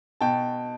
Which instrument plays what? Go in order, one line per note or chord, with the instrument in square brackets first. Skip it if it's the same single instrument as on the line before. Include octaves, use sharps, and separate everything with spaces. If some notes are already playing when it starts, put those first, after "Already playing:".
[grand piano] B2 G5 A5